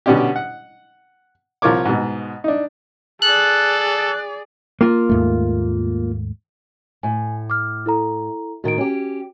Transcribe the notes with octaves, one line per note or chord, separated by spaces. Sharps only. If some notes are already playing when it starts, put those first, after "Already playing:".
B2 D3 C#4 D4 G4
F#5
C2 F3 F4 A#4 C#5 D6
G#2 B2
D4 D#4
G#4 A4 D5 F#6
A#3 F4
D#2 G#2 A3
A2 G#5
D6 F6
E4 A4 A#5
A2 D#3 F#4 D7
C#4 G4